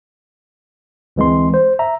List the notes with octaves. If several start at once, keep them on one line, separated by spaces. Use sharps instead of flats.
D2 E3 G#3 C4 C6
C5
E5 A#5